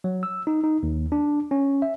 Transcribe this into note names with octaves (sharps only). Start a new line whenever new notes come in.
F#3
E6
D#4
D#4
D#2
D4
C#4
E5